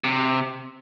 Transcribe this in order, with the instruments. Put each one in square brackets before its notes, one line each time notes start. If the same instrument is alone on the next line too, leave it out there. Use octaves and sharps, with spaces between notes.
[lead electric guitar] C3